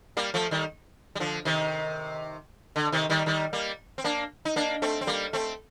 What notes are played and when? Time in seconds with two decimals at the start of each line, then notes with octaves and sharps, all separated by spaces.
0.17 G3 A#3
0.34 F3 A3
0.51 D#3 G3
1.15 G3
1.20 D3 F3
1.45 C3 D#3
2.76 D3
2.92 C3 D#3
3.10 D#3 G3
3.26 D#3 G3
3.53 G3 A#3
3.98 C4
4.04 A#3 D4
4.45 D#4
4.56 A#3 D4
4.82 A3 C4
5.01 C4
5.07 G3 A#3
5.33 A3 C4